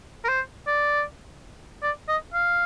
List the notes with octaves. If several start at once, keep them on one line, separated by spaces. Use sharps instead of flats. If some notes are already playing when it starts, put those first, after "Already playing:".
A#4
C5
D5
D5
D#5
F5